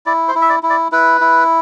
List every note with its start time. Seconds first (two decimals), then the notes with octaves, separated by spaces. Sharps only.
0.06 E4 D5
0.28 C5
0.35 E4
0.41 E5
0.49 D5
0.63 E4
0.70 D5
0.92 E4 B4
1.21 E4